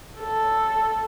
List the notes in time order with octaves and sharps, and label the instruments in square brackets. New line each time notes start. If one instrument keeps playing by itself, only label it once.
[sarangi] A4